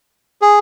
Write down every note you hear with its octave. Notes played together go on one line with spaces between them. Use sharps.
G#4